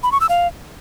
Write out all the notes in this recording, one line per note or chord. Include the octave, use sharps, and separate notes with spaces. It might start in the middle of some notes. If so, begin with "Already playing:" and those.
B5
C#6
E6
F5